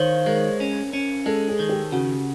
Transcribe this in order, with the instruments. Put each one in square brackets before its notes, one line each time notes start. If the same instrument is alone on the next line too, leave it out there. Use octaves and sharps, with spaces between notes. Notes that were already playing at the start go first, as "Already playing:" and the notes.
Already playing: [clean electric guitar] D#3 [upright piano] C5 C#5 F5
[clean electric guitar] G#3 [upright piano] A#4
[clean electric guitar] C#4
C#4
[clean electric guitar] G#3 [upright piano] A4
[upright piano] G#4
[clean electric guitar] D#3
[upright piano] G4
[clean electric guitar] C#3 [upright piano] F#4